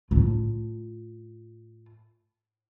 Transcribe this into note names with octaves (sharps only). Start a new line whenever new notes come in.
A2 F4